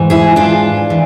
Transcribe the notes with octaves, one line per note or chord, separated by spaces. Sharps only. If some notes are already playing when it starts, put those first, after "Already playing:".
Already playing: G#2 E3
E4 G#4
D4 F4
E3